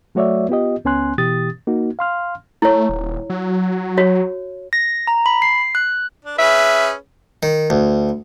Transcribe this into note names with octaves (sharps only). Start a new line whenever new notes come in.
F#3 A3 F#4 C#5 D5 E5
B3 F4 G4 D#5
C#2 B3 C#4 G#5 C6 F#6
B2 E3 G4 D#6 A6
A#3 D#4 F#4
F5 C6 F6
A3 E4 C#5
D#1
F#3
F#4 C#5
A#6
A#5
B5
C7
F#6
D4
C#4 G#4 B4 E5
D#3
D2